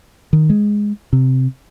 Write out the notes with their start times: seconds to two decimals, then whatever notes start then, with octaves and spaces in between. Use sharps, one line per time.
0.33 D#3
0.50 G#3
1.13 C3